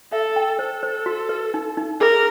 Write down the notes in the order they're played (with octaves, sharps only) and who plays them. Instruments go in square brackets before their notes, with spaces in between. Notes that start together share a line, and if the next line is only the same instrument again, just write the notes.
[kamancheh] A4 [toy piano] E5
[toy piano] G5
[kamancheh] A4 [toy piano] C5
[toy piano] C5
F#4
B4
D#4
D#4
[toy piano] G#4 [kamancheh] A#4